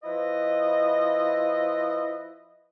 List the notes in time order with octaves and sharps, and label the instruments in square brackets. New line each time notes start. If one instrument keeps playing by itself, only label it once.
[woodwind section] F3 E4 B4 D#5